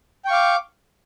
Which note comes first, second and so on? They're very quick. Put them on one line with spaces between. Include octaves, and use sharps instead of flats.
G5 C#6 F5 D6